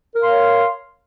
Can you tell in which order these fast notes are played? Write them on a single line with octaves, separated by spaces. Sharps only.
A#4 F5 C6 C#5